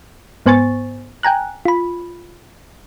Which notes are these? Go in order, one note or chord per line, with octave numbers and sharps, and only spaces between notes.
G#2 B3 C5 G#5 C#6 A6
G5 G#5 A#5 F#6
F4 B5